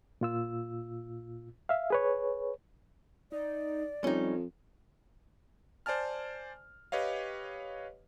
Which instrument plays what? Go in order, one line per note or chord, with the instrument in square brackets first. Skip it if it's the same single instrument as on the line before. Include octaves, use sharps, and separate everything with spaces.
[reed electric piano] A#2 F4 E6
E5 F5
G#4 B4 C#5
[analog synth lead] D#4 [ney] D5
[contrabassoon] F2 [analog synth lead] G3 [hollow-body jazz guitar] C#4 D#4
[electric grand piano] C5 D5 G#5 A5 F6
G4 B4 C#5 D#5 F5